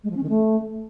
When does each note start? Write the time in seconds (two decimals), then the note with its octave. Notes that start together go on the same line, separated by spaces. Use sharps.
0.04 G#3
0.10 F3
0.16 C#4
0.23 D#3
0.29 A3